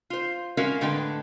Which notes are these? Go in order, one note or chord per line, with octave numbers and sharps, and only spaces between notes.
F4 C5
G#3 C#4 E4 F#4 A#4 F5
A2 D3 G#3 D4 B4 G5